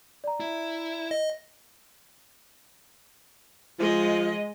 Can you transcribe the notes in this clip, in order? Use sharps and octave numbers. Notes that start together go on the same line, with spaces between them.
D5 A#5
E4
D#5
F3 G#3 D#5